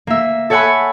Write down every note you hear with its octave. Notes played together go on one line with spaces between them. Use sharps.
A#3 E5
A4 C#5 E5 F#5 G#5 B5